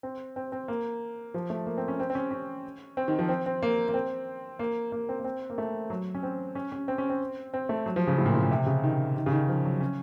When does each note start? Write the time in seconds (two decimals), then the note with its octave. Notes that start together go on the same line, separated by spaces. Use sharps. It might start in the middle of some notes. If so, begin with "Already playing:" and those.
0.03 C4
0.36 C4
0.52 C4
0.68 A#3
1.34 F3
1.50 A3
1.66 A#3
1.78 C4
1.88 C#4
2.00 C4
2.10 C4
2.15 C#4
2.31 C#4
2.97 C4
3.08 D#3
3.19 F3
3.29 C4
3.46 C4
3.62 A#3
3.88 A#3
3.94 C4
4.59 A#3
4.92 A#3
5.09 C4
5.19 A#3
5.24 C4
5.50 A#3
5.58 A3
5.90 F#3
6.15 C#4
6.23 C4
6.55 C#4
6.72 C#4
6.88 C4
6.98 C#4
7.10 C4
7.54 C4
7.69 A3
7.86 F#3
7.96 F3
8.07 C#3
8.18 A2
8.26 A#2
8.34 A2
8.43 A#2
8.51 C3
8.66 C#3
8.84 D#3
9.16 D#3
9.26 C#3
9.32 D#3
9.49 F3
9.65 F#3
9.81 C#4